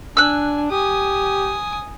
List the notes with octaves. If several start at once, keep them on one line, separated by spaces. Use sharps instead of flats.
D4 G#5 E6 F#6
G4 G#5 D#6